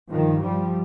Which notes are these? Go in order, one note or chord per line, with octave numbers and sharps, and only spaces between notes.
G2 D#3 F3
F3 G3